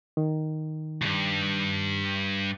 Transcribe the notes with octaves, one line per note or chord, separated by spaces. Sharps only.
D#3
C#2 G2